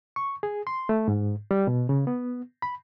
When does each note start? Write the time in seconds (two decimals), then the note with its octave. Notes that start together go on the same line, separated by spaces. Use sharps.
0.16 C#6
0.43 G#4
0.67 C6
0.89 A3
1.08 G#2
1.51 G3
1.67 B2
1.89 C#3
2.07 B3
2.62 B5